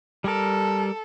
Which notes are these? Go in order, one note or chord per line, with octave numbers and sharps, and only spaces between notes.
G3 A4 A#4